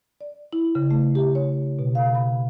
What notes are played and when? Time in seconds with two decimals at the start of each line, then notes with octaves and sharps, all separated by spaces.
0.21 D5
0.53 E4
0.75 C#3
0.91 A3
1.15 G4
1.35 C#5
1.79 B2
1.95 F5
2.15 B5